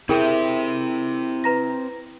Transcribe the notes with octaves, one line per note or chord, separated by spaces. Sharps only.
C4 E4 G4 G#4 A#4 C5 G5
B4 A#5 A#6